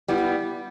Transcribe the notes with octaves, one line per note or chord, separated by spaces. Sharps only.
G3 B3 E4
E4